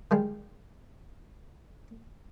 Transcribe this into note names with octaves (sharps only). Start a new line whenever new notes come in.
D#3 G3 G#3